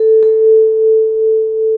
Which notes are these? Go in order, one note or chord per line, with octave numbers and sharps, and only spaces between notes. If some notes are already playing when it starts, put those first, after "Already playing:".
Already playing: A4
A4